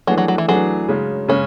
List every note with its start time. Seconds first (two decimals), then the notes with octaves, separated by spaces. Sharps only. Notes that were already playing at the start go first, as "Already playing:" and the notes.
0.07 E3 F#3 A3 D4 G#4
0.18 F#3
0.28 F#3
0.38 E3
0.48 E3 F#3 A3 D4 G#4
0.88 C#3 G#3 C#4
1.28 C#3 G#3 C#4